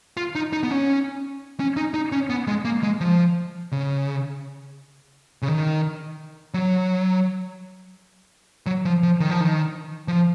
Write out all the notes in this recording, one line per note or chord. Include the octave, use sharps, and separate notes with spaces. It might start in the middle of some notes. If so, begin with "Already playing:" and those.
F4
D#4
D#4
B3
C#4
C#4
D#4
D#4
C#4
B3
G#3
A#3
G#3
F3
C#3
C#3
D#3
F#3
F#3
F3
F3
D#3
F3
D#3
F3